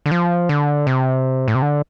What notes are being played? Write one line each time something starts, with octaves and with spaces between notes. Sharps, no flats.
D3
F3
D3
C3
A2
C3
D3